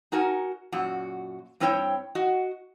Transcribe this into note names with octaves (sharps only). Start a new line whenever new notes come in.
D#4 F#4 A#4 G#5
F#2 A#2 F#4
G2 C4 E4 C5 C#5 G5
F#4 D#5